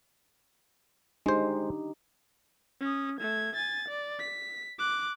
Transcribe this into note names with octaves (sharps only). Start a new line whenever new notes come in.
G#3 D4 D#4 G4 C5
C#4 D#6
A3 G#6
G#5 A6
D5
B6
D6 F#6